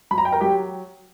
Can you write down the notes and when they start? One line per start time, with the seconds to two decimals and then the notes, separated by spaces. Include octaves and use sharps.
0.11 F#3 B5
0.18 A#5
0.25 G5
0.32 A#4 A#5
0.41 F#3 G4 G5